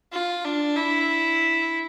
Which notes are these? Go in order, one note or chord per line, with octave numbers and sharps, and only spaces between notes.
F4
D4
E4